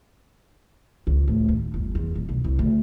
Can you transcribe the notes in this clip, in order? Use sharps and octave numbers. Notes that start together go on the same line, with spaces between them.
C#2
A2
D#2
G1
E2
D#1
B1
C2
D2